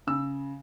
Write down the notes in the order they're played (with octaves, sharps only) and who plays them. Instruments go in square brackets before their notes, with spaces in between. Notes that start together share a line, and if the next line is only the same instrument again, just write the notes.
[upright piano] C#3 E6